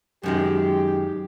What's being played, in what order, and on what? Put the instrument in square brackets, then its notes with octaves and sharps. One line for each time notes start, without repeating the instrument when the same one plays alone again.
[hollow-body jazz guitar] F#2 D#3 G#3 [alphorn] G4